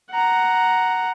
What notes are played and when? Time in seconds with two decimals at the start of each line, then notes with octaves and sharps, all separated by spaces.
0.11 F#5 A#5